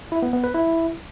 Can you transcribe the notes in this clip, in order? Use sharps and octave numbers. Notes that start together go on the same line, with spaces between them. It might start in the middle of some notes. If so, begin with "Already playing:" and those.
E4
B3
B3
B4
E4